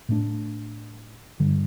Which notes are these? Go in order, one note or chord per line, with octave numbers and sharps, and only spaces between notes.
A2 A3 D4
G2 D3 G3